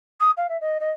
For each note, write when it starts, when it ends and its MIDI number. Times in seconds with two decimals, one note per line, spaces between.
0.20 0.31 87
0.37 0.47 77
0.49 0.59 76
0.60 0.78 75
0.80 0.91 75